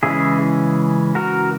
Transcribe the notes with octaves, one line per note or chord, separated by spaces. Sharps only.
C#3 E3 G#3 C#4 E4 G#4
F#4 A#4